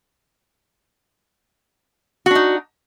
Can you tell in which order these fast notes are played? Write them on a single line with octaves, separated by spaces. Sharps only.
F#4 D4 D#4